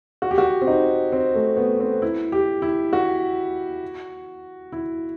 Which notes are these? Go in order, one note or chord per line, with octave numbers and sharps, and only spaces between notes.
F#4
G4
F#4
C4
D#4
C4
A3
B3
C4
E4
G4
E4
F#4
E4